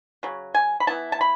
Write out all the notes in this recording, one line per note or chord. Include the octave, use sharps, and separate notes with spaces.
C#3 F#3
G#5
B5
E3 B3 E4 A5
A5
B5